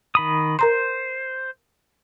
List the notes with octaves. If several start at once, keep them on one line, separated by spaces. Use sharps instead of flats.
D#3 B5 D#6
A#4 C5 A#5 C6